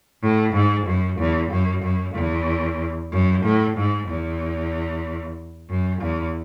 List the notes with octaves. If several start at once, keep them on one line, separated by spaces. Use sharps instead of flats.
A2
G#2
F#2
E2
F#2
F#2
E2
F#2
A2
G#2
E2
F#2
E2